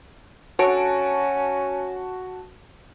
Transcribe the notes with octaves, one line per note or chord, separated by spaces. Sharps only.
D3 C#4 F#4 C#5 A5 D7